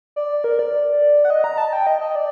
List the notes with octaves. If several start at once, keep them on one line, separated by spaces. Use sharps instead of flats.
D5
A#4
D5
F#5
D#5
A#5
A5
G5
D#5
D#5
D5